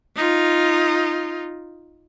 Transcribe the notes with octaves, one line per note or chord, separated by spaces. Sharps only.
D#4 F4